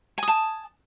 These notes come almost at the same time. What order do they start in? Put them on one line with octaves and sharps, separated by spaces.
G#5 D#6 A5